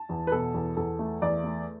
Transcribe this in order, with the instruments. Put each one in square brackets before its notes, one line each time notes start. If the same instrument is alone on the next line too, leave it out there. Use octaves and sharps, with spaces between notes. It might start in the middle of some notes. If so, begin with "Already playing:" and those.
Already playing: [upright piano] A5
E2
B4
B2 A4
E2
E2 A4
A3
E2 D5
A3